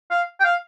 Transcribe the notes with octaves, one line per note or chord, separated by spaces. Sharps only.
F5
G5
F5